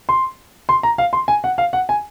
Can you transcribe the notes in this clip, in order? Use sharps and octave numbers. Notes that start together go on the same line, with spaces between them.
C6
C6
A#5
F5
C6
G#5
F#5
F5
F#5
G#5